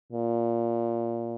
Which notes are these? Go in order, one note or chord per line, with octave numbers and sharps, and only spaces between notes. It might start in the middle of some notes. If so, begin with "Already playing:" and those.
A#2